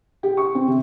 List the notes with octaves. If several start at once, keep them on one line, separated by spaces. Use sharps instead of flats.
G4
C#6
C4
C3